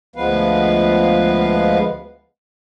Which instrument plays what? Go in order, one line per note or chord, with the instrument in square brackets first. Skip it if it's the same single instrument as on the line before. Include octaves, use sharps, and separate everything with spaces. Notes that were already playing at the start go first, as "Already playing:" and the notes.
[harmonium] D2 F3 G#3 B3 B4 F5